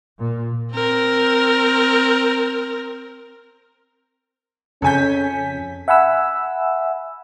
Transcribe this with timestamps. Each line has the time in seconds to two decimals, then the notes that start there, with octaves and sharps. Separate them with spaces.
0.19 A#2
0.73 C4 A#4
4.82 F2 C#3 C#4 A4 G#5 G6 B6
5.88 E5 F#5 G#5 B5 E6